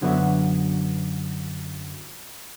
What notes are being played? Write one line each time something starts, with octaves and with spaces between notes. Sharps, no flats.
F#2 D3 F#3 B3 F#4 E5